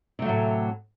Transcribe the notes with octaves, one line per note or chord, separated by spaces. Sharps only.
A2 C3 F#3 A3